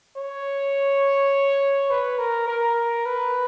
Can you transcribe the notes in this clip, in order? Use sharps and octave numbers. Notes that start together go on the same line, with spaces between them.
C#5
B4
A#4
A#4
B4